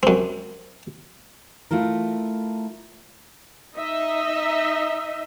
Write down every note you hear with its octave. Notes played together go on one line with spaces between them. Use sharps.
F#2 C4
A3 E4 F4 A#4
D#4 D#5 E5